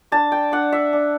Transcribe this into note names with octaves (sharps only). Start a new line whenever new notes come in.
D4 A5
G5
D4 F#5
E5
D4